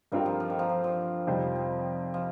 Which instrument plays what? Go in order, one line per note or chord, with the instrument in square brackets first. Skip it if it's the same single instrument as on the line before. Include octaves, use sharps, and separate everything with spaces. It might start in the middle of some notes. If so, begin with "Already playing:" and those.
[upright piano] G2 G3 C4 F4 A#4 [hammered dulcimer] D#3
[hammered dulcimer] F3
F3
D#3
F3
F3
F3
[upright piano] F2 C3 G3 D#4 C5
[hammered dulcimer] F3
F3